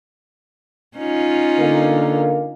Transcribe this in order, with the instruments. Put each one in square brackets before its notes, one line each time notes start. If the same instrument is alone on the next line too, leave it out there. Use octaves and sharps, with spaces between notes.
[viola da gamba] C#4 D#4 F4
[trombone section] D3 A#3